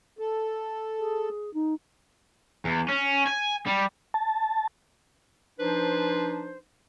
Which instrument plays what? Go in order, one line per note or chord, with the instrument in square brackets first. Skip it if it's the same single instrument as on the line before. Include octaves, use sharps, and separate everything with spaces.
[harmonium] A4
[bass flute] G#4
D#4
[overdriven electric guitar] E2
C#4
G#5
G3
[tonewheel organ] A5
[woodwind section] F3 D4 D#4 B4 C5